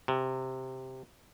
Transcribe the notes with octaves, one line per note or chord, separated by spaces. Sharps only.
C3